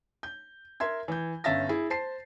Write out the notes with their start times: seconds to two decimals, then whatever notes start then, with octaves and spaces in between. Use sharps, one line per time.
0.23 G6
0.80 A#4 E5 C6 G#6
1.08 E3 G6
1.44 G1 C#4 E5 F5 A6 A#6
1.69 E4 G#4
1.90 C5 A5 C7